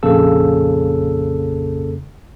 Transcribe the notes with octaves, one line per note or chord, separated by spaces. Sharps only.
A#1 F2 C#3 A#3 A4 E6